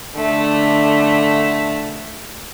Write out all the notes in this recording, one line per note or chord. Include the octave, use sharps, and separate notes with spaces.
D3 A3